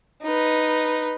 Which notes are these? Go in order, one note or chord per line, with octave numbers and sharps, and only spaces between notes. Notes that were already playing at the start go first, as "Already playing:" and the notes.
D#4 B4